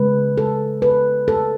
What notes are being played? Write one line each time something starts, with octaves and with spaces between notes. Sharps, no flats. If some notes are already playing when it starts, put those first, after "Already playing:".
Already playing: C#3 G#3 B4
A4
B4
A4